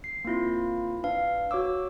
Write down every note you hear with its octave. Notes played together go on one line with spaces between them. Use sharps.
C7
A#3 C4 E4 F4
D4 B4 F5
F#4 C#5 D6 E6